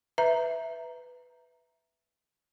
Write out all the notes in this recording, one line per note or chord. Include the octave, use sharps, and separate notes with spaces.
B4 E5 A#5